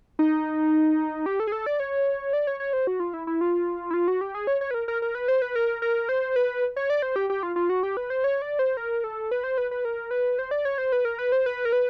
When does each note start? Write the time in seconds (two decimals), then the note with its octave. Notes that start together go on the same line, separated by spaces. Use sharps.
0.19 D#4
1.26 G4
1.40 A4
1.47 G#4
1.52 A4
1.66 D5
1.80 C#5
2.33 D5
2.47 C#5
2.60 C#5
2.73 C5
2.87 F#4
3.00 F4
3.14 E4
3.27 E4
3.41 F4
3.90 E4
3.94 F4
4.08 F#4
4.21 G4
4.35 G#4
4.47 C#5
4.61 C#5
4.71 B4
4.74 A#4
4.88 A#4
5.02 A#4
5.15 B4
5.28 C5
5.42 B4
5.56 A#4
5.82 A#4
6.09 C5
6.36 B4
6.76 C#5
6.90 D5
7.02 C5
7.16 G4
7.30 G4
7.43 F4
7.56 F4
7.70 F#4
7.83 G4
7.97 B4
8.10 C5
8.24 C#5
8.42 D5
8.59 C5
8.77 A#4
9.04 A4
9.31 B4
9.44 C5
9.58 B4
9.71 B4
9.85 A#4
10.11 B4
10.39 C5
10.51 D5
10.65 C#5
10.78 C5
10.92 B4
11.05 A#4
11.19 B4
11.32 C5
11.46 B4
11.65 A#4
11.73 B4